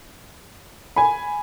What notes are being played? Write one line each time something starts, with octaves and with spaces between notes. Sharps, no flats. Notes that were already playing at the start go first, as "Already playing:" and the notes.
G#5 B5